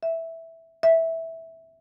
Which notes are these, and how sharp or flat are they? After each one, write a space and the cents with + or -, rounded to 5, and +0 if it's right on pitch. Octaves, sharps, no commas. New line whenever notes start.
E5 -5
E5 -10